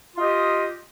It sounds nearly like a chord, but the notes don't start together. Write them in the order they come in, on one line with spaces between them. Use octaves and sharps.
F4 D#5 G4